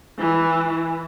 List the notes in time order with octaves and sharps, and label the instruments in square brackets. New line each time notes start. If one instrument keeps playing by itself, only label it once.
[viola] E3